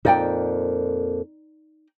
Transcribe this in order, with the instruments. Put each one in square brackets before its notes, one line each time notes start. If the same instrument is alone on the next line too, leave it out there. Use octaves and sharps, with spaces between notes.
[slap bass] F2 A#2 [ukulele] D#4 D5 G5